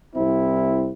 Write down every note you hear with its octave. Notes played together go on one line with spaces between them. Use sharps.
C2 C4 E4